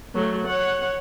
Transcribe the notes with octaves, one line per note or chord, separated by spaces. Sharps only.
F#3 A3
C#5 F#5